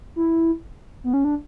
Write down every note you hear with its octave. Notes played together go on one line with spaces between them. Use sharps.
E4
B3
C#4
D4